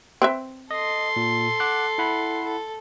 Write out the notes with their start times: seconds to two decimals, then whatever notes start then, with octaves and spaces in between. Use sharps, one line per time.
0.22 C4 B4 E5
0.71 A4 D#5 C6
1.16 A#2
1.60 F#5 D6 F#6
1.98 E4 F#5 B5
2.44 A4